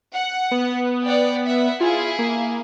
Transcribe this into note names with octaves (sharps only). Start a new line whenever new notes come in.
F#5
B3
D5 F#5 G5
E5 F#5
E4 F4 G#4
A#3